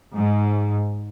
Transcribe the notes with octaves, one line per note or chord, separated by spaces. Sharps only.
G#2